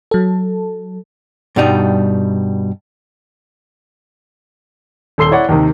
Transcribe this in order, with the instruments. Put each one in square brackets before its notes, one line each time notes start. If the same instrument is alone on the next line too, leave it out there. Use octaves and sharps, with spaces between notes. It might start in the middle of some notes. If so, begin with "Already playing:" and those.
[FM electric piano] F#3 A4
[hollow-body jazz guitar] G2 B2 G3 D#4
[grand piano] D#1 A4 C6 C7 G7
E4 C#5 D5 F#5
D#2 C3 D#3